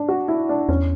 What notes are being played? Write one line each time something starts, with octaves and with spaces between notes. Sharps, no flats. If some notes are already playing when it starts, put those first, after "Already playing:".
Already playing: D4
F#4
E4
D4
E2 C#4